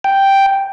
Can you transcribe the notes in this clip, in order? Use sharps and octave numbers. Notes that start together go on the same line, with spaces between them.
G5